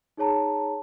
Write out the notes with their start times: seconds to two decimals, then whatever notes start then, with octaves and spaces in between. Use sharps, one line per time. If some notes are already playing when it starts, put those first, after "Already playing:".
0.17 D#4 G#4 C#5 A5 A#5